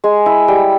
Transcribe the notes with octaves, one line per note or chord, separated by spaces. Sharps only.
G#3 G#5
E4
G3 G5